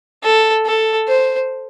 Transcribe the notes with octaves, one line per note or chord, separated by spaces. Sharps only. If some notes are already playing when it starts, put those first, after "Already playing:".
A4
A4
C5